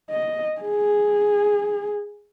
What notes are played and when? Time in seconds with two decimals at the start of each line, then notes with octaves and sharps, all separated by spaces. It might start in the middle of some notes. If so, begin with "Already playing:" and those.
0.11 D#5
0.61 G#4